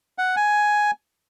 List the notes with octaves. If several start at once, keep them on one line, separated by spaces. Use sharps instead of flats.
F#5
G#5